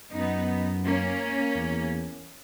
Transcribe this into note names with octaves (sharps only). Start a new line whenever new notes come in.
F#2 B3 D#4
A#3 C#4
E2